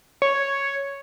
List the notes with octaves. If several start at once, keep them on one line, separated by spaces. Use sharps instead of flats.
C#5